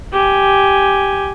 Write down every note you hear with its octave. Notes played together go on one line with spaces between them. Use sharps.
G4 G#5